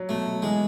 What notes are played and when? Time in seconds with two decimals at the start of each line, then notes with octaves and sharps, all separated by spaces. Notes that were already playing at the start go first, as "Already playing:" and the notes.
Already playing: F#3
0.09 B2 A3
0.26 B2
0.42 E3 G#3